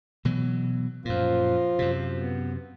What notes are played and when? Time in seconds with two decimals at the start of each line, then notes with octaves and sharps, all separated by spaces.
0.25 B2 E3 F#3
1.05 F#2 A#2 F3 F4
1.79 F#2 C3
2.18 B3